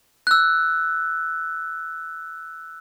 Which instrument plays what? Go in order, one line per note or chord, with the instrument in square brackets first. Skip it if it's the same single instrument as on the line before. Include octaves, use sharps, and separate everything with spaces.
[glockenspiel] E6 F#6